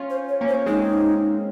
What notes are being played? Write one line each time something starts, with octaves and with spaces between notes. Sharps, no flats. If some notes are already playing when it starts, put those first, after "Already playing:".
Already playing: C#4 F4
C5
C#5
A#3 C#4
C5
G#3 C4 D#4